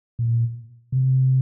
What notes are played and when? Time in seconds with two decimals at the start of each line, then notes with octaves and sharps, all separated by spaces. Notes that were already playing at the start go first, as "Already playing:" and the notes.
0.19 A#2
0.92 C3